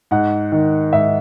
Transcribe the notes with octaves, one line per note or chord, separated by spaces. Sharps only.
G#2 F#5
D#3
G#2 E5